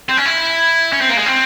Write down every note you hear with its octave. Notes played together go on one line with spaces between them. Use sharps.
C4
C#4
E4
C#4
C4
A#3
G#3
C4